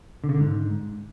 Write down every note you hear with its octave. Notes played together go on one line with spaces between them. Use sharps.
D3
C#3
D3
G#2